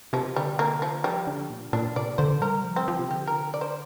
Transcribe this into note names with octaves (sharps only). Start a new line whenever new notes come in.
C3 F3
D3 G3
A#3
F3
F3 G3
D3
A#2
A#2 D4
C3 D5
D3 C5
G3 A#4
F3
C4
F3
C3
D3 G4
A#4
D5
C5